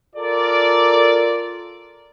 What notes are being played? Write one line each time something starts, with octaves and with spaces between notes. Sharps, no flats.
F4 A4 A#4 D5